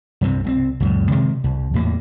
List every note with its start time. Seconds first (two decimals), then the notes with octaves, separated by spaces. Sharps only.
0.21 C2 G2 C3 C4
0.44 C2 G3 C4
0.80 C#2 F#2 A#2
1.11 C3 D#3 G#3
1.44 C2
1.74 E2 A2 A3 A#3